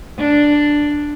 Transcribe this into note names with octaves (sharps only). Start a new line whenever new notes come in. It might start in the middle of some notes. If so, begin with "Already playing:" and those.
D4